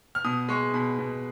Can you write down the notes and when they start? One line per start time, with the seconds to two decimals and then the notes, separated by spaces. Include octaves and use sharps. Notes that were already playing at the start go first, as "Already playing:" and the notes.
0.15 F6
0.24 B2 D#6
0.49 G#3 C#6
0.74 B2 B5
0.99 B2